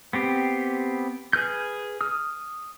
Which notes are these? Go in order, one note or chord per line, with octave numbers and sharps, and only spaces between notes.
B3 C4 G4
G#4 B4 F6 G6
D#6 F6